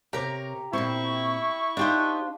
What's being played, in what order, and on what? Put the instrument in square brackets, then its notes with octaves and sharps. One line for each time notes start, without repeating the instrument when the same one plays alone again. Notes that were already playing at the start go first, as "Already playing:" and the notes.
[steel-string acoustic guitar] C3 A#4 C#5 [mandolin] G4 A#5
[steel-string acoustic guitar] A#2 C4 [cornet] E4 [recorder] C#6
[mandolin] D4 F4 C5 [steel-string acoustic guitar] D#4 G4 D#5